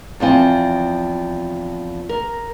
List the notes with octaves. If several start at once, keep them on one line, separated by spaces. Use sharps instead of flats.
E2 F3 C4 G#5
A#4